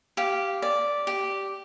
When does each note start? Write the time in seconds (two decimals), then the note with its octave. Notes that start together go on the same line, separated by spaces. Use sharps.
0.17 G4 F5
0.62 D5
1.07 G4